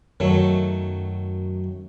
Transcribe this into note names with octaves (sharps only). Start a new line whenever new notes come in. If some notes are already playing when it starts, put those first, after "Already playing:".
F#2 D#3 F#3 A3